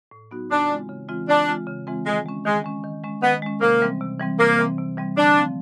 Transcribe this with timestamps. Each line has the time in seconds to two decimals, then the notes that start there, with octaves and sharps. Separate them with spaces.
0.11 A2
0.31 F#3 B3 D#4 F#4
0.51 C#3 D4
0.70 E3 G#3 C4 F4
0.89 C#3
1.09 E3 G#3 C4 F4
1.28 C#3 D4
1.48 E3 G#3 C4 F4
1.67 C#3
1.87 E3 G#3 C4 F4
2.06 D#3 G#3
2.26 G#3 C#4
2.45 D#3 G#3
2.64 G#3 C#4
2.84 D#3
3.03 G#3 C#4
3.22 D#3 B3
3.42 G#3 C#4
3.61 C3 A#3
3.81 E3 G3 C4
4.00 C3
4.20 E3 G3 C4
4.39 C3 A#3
4.59 E3 G3 C4
4.78 C3
4.97 E3 G3 C4
5.17 D3 D4
5.37 F3 A3 C4